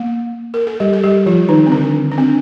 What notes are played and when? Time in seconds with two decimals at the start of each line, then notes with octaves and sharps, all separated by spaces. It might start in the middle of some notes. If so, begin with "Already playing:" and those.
Already playing: A#3
0.54 A#4
0.67 A4
0.80 G3 G4
0.93 A4
1.04 G3 G4
1.26 F3 F4
1.49 D#3 D#4
1.66 C4
1.72 D3 D4
2.11 D4
2.18 C4